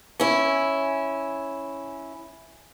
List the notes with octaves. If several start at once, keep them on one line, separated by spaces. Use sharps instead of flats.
C#4 E4